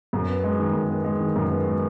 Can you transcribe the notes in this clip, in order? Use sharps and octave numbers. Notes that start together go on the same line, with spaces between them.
F#2
B3
G#3
D#3
F#2
B3
G#3
D#3
F#2
B3
G#3